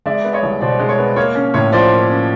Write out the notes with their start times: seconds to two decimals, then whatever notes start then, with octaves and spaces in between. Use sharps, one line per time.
0.06 G#3 D5 E5
0.24 B3
0.33 C#5 D#5
0.43 C2
0.61 B2 C5 D5
0.79 G#3
0.89 C#5
0.98 B3
1.16 A#3 C#5
1.35 C#4
1.54 A2 C#5
1.72 F3 C5 D5
1.91 A#3
2.09 C#4